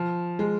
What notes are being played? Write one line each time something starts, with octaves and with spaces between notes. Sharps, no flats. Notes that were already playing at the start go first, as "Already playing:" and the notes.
Already playing: F3
G#3